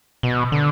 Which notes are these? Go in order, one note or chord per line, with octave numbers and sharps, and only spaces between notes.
B2
D3